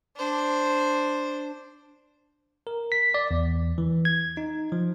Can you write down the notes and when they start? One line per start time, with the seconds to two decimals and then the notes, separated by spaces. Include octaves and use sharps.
0.17 D4 C5
2.67 A#4
2.92 B6
3.14 D5
3.31 E2
3.78 E3
4.05 G#6
4.37 D#4
4.72 F3